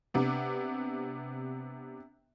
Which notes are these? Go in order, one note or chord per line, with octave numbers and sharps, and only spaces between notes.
C3 B3 D4